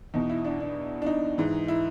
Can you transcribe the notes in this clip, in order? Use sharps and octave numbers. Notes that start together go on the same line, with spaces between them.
E2 B2 D#4
E4
D4
D4
D4
D#4
G#2 E3
E4